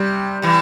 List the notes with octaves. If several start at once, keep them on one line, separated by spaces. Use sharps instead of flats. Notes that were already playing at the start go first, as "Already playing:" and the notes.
Already playing: C3 G3
C3 E3